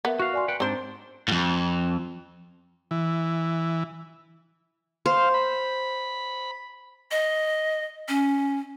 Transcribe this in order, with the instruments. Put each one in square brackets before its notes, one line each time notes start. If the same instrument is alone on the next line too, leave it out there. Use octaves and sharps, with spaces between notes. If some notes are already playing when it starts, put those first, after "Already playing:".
[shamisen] B3 [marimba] A#4 E5
[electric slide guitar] F#4 F5 [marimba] F#6
[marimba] D5 G#5 C6
[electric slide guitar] B4 F#5 G5
[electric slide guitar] G#2 D4 [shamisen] C4 C5 [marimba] A5 A#5
[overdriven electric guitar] F2 G#2
[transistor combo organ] E3
[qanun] C5 [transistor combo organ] F5
[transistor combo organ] B5
[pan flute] D#5
C#4